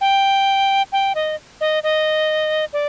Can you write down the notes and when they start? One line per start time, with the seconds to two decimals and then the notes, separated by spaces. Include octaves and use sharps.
0.01 G5
0.92 G5
1.15 D#5
1.61 D#5
1.83 D#5
2.73 D5